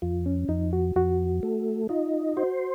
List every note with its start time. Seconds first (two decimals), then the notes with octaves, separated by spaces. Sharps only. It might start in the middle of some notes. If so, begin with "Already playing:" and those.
0.02 F2 F4
0.26 C#4
0.49 F2 D#4
0.73 F#4
0.96 F2 F#4
1.43 A3
1.89 D#4 F4
2.37 F#4 C5